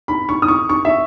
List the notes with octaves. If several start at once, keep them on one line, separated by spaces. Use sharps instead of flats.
B5
C#6
D#6
C#6
C#6
E5